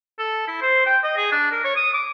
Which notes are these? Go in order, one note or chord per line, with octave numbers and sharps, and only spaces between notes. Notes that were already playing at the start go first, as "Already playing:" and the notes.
A4
E4
C5
G5
D#5
G#4
D4
A#4
C#5
D#6
D6